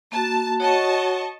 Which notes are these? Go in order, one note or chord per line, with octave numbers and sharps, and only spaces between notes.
A#3 F#4 A5
F#4 C#5 D#5 F#5 A5 C#6